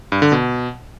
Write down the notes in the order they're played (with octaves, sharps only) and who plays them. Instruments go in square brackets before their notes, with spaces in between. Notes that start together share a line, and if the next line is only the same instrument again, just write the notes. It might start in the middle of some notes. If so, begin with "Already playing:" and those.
[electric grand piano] G2
D3
B2